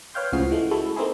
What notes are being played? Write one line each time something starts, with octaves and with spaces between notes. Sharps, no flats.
B4 C#5 F5 G5 C6
C#2 A2 F3 F#4 G#4 C7
E3 G#3 A3
G#3 A3 E4 F#4 A4
A3 A#3 C4 D#4 E4 G#4